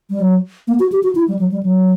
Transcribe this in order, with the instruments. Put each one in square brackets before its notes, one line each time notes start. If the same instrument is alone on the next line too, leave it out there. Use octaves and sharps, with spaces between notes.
[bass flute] G3
F#3
A#3
F#4
G4
F#4
E4
G3
F#3
G3
F#3